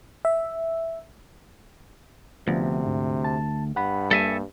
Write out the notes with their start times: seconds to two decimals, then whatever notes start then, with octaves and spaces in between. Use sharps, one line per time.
0.25 E5
2.48 D2 C3 F3 B3 D4
2.85 G#2
3.24 A5
3.76 G2 F#5 B5
4.11 G3 A#3 A4 E5 G#5